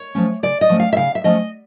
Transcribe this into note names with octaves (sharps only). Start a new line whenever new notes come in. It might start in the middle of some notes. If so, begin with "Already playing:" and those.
Already playing: C#5
F3 A3 C#4
C#3 D5
D#5
F3 A3 C#4
F5
E5
C#3 F5
E5
F3 A3 C#4 D#5